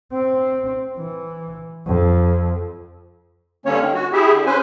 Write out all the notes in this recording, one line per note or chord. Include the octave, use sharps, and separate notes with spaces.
C4
E3
F2
G2 D3 A#3 C#4 C#5
D#3
F#4
E4 G4 G#4 E5
D3
C#4 B4 C5 G#5